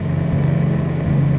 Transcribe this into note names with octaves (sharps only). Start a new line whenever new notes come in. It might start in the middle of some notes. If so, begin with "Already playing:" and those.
Already playing: F#2 C#3 E3 G#3
F#2 C#3 E3 G#3
F2 C#3 E3 G#3